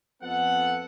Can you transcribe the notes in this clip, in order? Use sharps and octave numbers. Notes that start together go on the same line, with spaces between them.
F2 B3 A4 F#5